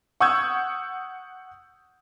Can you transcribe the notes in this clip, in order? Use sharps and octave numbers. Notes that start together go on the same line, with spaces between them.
F#5 C#6 D#6 E6 G6 G#6